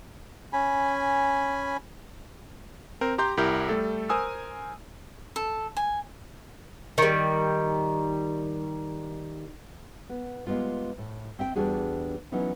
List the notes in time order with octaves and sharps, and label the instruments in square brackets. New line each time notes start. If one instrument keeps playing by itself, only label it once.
[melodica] C#4 G#5 B5
[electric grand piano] C4 A#4 C5
G4 A#5 C6 G6
C2 E4 G4 A#4 G6
G3 A3 A4
A#4 C5 G#5 D#6 E6
[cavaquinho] A4
G#5
[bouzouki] D#3 G3
[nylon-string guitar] B3
G3 G#3 A#3 B3 F4
A2
C4 E5 G5
E2 G3 D4 F#4 G#4
E3 F#3 B3 C#4 D#4 E4